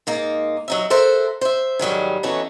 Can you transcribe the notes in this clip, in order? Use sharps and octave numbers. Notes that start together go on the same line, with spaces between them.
G#2 A#3 D#4
F#3 D#4 E5
A4 A#4 C5 E5 F#5
C5 E5
G#2 D#3 F#3 G3
E3 F#3 A3 B3 C#4 D#4